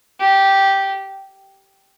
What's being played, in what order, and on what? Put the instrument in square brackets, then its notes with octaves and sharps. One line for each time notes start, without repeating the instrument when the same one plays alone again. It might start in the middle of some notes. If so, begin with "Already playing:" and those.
[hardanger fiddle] G4